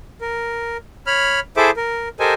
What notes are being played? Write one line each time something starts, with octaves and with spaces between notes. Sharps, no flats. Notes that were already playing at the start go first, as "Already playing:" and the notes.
A#4
C#5 B5 F6
E4 G#4 A4 C5 E5 D6
A#4
G4 A4 A#4 C5 D#5 G#5